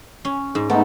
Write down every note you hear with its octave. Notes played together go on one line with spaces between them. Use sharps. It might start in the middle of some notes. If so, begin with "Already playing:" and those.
C#4
G#2
G#3 A3 B3 D#4 A4